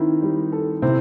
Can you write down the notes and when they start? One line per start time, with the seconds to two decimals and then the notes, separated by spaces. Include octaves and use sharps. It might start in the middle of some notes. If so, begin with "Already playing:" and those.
Already playing: D#3 C4 D#4 E4
0.22 G3
0.52 A4
0.82 C3 C4 E4